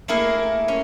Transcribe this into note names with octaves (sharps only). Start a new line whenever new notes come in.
A3 A#3 E4 G#4 A#4
C#4